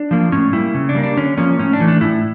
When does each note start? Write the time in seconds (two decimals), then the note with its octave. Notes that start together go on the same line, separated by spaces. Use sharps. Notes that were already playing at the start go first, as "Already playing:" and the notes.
Already playing: D4
0.11 F3 A#3
0.32 A2 C#4
0.53 G3 A#3 E4
0.74 C#3
0.89 D4
0.95 G3 A#3
1.03 D4
1.17 D3 C#4
1.37 F3 A#3 C#4
1.59 A2 C#4
1.73 D4
1.80 E3 A3
1.88 D4
2.01 A2 E4